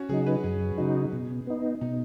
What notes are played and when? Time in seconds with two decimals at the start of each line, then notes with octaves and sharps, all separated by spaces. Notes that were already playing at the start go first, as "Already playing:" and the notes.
Already playing: C#4 F#4
0.09 C#3 F#3 D#4 G#4
0.26 B4
0.44 F#2 G#4
0.78 C#3 F#3 D#4
1.13 B2
1.47 B3 D#4
1.81 B2 D#4